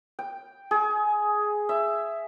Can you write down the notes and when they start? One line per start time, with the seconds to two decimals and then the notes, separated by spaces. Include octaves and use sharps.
0.19 G5
0.71 G#4
1.69 E5